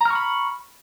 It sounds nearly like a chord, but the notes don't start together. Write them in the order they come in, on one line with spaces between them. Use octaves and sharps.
A#5 F6 C#6 B5